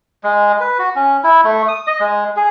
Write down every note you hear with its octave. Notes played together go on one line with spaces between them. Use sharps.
G#3
B4
F#4
C#4
E4
A3
D#6
D#5
G#3
G#4